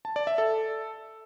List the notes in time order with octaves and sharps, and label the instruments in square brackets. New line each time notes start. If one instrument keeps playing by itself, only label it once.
[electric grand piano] A5
D5
E5
A4